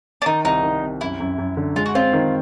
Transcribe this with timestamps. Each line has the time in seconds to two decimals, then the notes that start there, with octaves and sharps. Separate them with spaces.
0.22 D4
0.26 D#3 D#4
0.45 C2 D#4
0.63 D#3
0.82 C2
1.01 F#2 E4
1.20 F#2
1.38 F#2
1.57 D3
1.76 G#3 F4
1.86 F#4
1.95 C4 F4
2.13 D#3